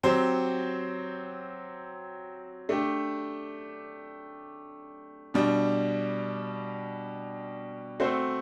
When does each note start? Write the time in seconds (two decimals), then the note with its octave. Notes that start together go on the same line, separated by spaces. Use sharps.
0.03 F#3 C4 G4 C5
2.69 A3 D4 G4
5.34 B2 G3 D4
8.00 A3 C4 F#4 C5